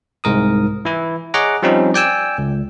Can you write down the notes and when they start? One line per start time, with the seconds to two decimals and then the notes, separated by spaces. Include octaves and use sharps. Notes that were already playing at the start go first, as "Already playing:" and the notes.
0.24 C2 G#2 A#4 D#6
0.85 E3 E4
1.34 G#4 C#5 D#5 F#5 A#5 D6
1.63 F3 G3 C4 C#4 D#4
1.94 D5 G5 G#5 E6
2.38 C#2